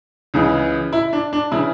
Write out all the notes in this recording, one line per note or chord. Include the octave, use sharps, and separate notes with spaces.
C#2 C#3 E3
E4
D4
D4
C#3 E3 E4